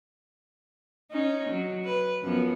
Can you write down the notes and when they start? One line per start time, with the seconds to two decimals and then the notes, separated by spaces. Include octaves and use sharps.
1.11 C#4 D#4
1.50 F#3
1.85 B4
2.23 F#2 F3 B3